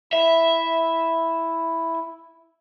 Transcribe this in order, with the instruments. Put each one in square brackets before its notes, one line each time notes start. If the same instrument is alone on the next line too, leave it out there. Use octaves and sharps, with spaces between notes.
[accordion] E4 [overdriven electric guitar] E5